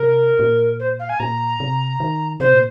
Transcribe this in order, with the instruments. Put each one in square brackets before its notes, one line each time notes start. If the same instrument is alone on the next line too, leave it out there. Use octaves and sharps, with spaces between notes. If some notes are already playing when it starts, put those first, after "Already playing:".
Already playing: [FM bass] C3 [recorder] A#4
[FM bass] A#2
[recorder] C5
F5
G#5
[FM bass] A#2 [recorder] A#5
[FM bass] C3
D#3
[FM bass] C3 [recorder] C5
[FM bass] A#2